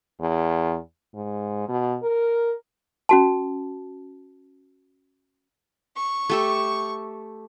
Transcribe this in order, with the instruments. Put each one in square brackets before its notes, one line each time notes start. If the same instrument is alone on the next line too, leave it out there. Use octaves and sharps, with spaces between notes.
[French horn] E2
G#2
B2
A#4
[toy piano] C#4 F#4 A5
[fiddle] C#6
[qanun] A3 G4 E5